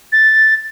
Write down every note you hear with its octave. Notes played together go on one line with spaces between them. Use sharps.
A6